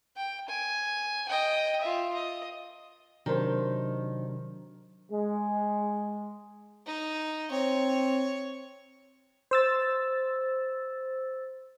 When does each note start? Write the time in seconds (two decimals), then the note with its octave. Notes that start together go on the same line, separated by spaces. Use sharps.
0.16 G5
0.48 G#5
1.29 D#5 G5
1.81 F4 E5
2.14 D#5
3.26 C3 D#3 F#3 D4 C5
5.12 G#3
6.86 D#4
7.51 C4 C#5
9.51 C5 E6 A6